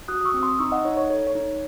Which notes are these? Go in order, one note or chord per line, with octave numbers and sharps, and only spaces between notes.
F#4 D#6 F#6
D#6
C#6 E6
C4
C6 D#6
D#4 C#6 E6
D#5 F#5
D#4 C#5
C#5
A4 C#5
C#5
D#4
C#5